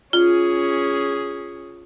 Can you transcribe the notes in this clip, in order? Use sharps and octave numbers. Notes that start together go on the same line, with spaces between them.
C#4 F4 G#4